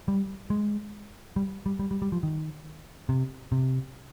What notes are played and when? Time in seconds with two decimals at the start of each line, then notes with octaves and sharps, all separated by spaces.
0.08 G3
0.50 G#3
1.36 G3
1.66 G3
1.79 G3
1.91 G3
2.02 G3
2.12 F3
2.23 D#3
3.09 C3
3.52 C3